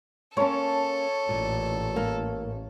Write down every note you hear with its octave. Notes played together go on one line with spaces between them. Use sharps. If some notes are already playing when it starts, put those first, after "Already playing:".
A#3 C#4 A4 C#5 A5
A1 A#2
A#3